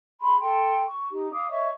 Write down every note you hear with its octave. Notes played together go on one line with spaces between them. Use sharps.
G#4 B5 C6
A4 G5 C6
C#6
D#4 G4
F5 D6 D#6
C#5 D#5 E5 C#6